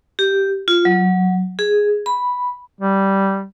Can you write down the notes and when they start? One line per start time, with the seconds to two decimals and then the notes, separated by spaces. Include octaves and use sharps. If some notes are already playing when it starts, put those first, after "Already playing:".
0.19 G4
0.68 F4
0.85 F#3
1.59 G#4
2.06 B5
2.81 G3